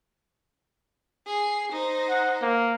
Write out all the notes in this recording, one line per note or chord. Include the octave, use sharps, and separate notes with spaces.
G#4 C7
D#4 C5
F#5
A#3